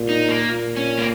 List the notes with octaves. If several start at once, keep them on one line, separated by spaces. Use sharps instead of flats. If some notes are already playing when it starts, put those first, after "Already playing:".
Already playing: A#2
D#4
A#3
A#2
C#4
A#3